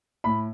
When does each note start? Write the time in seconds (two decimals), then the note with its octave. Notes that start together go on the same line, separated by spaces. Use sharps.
0.24 A2 B5